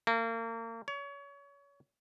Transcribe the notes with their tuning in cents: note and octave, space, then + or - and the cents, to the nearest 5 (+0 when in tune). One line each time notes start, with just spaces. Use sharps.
A#3 -35
C#5 +30